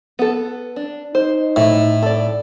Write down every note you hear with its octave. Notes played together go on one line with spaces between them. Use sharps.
B3 A4
D4
D#4 C5
A2
A4 D5